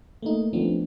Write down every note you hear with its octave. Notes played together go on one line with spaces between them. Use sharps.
A3 A#3 D#4
F3 A3 B3 C4 D4